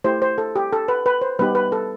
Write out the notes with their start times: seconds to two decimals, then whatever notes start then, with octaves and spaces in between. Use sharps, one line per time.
0.04 A3 E4 G4 C5
0.22 C5
0.38 A4
0.56 G4
0.72 A4
0.88 B4
1.06 B4
1.21 C5
1.39 G3 B3 D#4 G4 B4
1.55 B4
1.72 A4